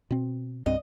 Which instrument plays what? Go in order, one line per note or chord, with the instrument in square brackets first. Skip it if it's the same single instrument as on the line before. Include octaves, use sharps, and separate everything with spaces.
[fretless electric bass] B2 C4
[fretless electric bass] C2 G2 C4 [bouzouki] D#5